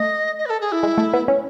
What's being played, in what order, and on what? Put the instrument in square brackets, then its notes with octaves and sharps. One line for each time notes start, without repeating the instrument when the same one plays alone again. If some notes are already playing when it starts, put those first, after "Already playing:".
Already playing: [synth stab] A3 [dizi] D#5
[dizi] D#5
B4
A4
G#4
E4
[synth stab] G#3
A3
B3
C#4